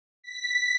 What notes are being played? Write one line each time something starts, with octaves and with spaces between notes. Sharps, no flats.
B6